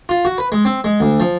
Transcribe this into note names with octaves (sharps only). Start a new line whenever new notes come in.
F4
F#4
B4
G#3
C4
G#3
D2
F3